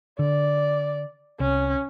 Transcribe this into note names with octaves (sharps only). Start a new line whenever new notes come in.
D3 D5
C2 C#4